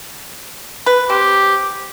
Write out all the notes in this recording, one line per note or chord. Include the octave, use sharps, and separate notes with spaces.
B4
C4 G4